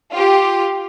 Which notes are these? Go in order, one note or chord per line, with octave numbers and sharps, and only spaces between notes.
F4 G4